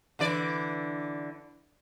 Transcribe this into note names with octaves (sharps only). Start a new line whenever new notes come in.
D3 E3 D5